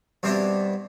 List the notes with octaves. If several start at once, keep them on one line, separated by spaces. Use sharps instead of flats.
G2 B2 G3 C4 D4 E4